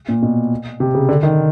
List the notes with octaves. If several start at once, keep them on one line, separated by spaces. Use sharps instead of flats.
A#2
B2
C3
C#3
D3
D#3